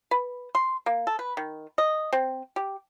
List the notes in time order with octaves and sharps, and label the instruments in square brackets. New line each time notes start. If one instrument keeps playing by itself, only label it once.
[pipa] B4
C6
A#3
A4
B4
D#3
D#5
C4
G4